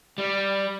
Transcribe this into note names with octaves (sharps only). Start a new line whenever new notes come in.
G3